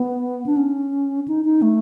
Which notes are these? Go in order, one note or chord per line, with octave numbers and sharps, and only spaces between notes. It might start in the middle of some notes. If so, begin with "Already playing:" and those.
Already playing: B3
D4
C#4
D#4
D#4
A3